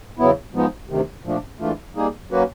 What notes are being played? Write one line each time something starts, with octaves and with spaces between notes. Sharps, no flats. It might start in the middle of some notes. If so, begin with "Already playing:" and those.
E2 C#3 F#3 B3 E4
G#2 F3 G#3 B3 D#4
D2 C3 D#3
A#2 F3 A3 D4
G#2 E3 A3 D4 F4
G3 A#3 D#4 G#4
F#3 A#3 C#4 F#4 B4